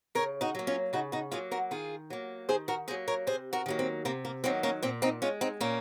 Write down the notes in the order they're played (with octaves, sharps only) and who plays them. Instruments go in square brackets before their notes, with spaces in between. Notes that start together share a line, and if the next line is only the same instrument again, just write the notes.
[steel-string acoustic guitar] C#3 A#4 C#5
D#4 F#4
F#3 A#3
C#4 F4
C#3 D#4 F#4
D#4 F#4
F#3 A#3 F4 G#4
F#4 A#4
D#3 F4 G#4
F#3 A#3
D#3 G#4 C5
F#4 A#4
F#3 A#3 G#4 C5
A#4 C#5
C3 G#4 C5
F#4 A#4
D#3 F#3 A#3
C4
C3 A#3
A#3
D#3 F#3 A#3 C4
A#3 C#4
A#2 C4
C4 D#4
G#3 C#4 F4
C4 D#4
A#2 A#3 C#4